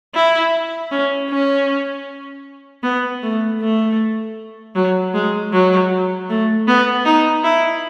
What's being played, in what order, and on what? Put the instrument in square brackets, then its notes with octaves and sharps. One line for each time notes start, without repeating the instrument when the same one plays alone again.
[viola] E4
C#4
C#4
B3
A3
A3
F#3
G#3
F#3
A3
B3
D#4
E4